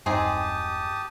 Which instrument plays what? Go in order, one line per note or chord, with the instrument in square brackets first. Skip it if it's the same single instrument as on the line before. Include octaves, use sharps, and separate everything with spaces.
[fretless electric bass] E1 G2 [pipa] C4 D#4 G#4 [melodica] G4 A5 D#6